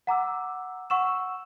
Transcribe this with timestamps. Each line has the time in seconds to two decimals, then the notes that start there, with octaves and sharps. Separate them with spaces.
0.07 F#5 A#5 D6 E6
0.90 F#5 C#6 E6 E7